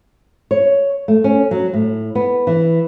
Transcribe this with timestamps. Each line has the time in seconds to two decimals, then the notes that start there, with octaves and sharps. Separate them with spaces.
0.51 C#5
1.08 A3
1.24 C#4
1.51 F#3
1.74 A2
2.15 B3
2.47 E3